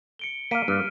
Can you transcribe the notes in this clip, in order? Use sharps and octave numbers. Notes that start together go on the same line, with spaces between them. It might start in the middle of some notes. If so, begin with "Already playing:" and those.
C#7 D7 G7
A#3 F5 B6 D7 D#7
G2 F6